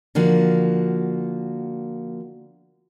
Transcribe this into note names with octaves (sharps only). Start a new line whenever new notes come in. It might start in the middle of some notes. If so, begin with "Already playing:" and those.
D3 F3 A#3 F#4